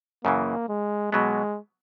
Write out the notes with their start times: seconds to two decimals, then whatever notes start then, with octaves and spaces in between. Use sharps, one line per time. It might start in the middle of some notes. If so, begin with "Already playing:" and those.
0.24 F#2 C#3 E3 A#3
0.69 G#3
1.12 B2 F#3 G#3 B3